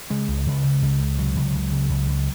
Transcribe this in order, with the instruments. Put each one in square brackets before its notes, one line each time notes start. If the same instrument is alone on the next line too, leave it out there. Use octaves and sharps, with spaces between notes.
[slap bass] C#3 G#3
C#2
C#2
C#3
C#2
C#2
C3 F#3
C#2
C#2
C#3
C#2
C#2